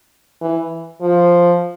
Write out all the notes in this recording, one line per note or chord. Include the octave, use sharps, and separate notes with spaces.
E3
F3